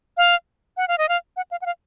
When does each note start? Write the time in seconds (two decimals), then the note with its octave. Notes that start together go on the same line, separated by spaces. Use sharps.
0.17 F5
0.77 F#5
0.88 F5
0.98 D#5
1.09 F5
1.37 F#5
1.51 F5
1.62 F#5
1.66 F5